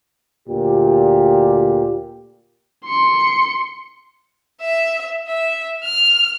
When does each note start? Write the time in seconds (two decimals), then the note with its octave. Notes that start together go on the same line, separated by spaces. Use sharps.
0.49 D2 A#2 G4
2.86 C6 C#7
4.60 E5
5.27 E5
5.81 F6